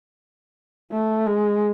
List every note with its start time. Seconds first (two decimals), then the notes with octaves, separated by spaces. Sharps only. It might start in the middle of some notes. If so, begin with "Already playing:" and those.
0.92 A3
1.26 G#3